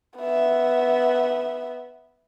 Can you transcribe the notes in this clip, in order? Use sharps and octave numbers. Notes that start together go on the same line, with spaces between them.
B3 E5